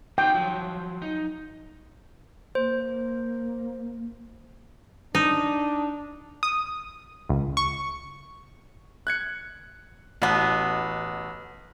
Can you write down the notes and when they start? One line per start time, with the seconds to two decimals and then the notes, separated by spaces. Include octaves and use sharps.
0.18 D#4 F4 F#4 G5
0.34 F3 F#3
1.02 D#4
2.55 A#3 C5
5.15 D4 D#4
6.43 D#6
7.29 C#2
7.57 C#6
9.07 F#6 G#6 C#7
10.22 A1 B2 B3